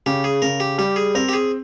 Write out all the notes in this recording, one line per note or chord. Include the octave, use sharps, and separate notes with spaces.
C#3 G4
G#4
C#3 A#4
G4
G3 G4
G#4
C4 A#4
G4
G#4